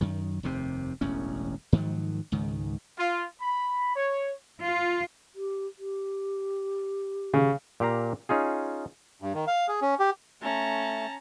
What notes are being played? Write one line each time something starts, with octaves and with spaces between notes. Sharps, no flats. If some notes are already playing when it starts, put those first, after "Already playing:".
F#2 D#3
F1 D#2 C3 C4
E1 A1 F#2 C#4
G#2 D#3 F3 F#3
C#2 G#2 D#3
F4
B5
C#5
F4
G4
G4
C#3
A#2 G4 F5 A#5
C#4 D#4 F4 G#4
G2
D#3
F5
G#4
C#4
G4
A3 C#4 A5 A#5